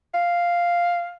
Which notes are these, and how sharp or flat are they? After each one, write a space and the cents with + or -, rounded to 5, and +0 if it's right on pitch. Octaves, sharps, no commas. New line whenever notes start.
F5 +0